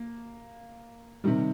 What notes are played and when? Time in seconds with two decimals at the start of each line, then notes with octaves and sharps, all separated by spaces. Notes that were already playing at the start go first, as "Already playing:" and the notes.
Already playing: A#3
1.24 C3 D#3 G3